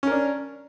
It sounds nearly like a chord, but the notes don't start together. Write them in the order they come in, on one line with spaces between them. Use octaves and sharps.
C#4 A#4 D4